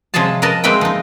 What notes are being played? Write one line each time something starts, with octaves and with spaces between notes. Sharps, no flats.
C3 F3 F#3 G#3 G#4 A5
A#4 B4 D#5 A5
G#3 A#3 C4 B4 E5 G5
F3 D#4